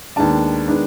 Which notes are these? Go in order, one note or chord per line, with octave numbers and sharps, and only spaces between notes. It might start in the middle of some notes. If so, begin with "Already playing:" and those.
D#2 D#3 G#3 B3 D4 A5
D#3 G#3 B3 D4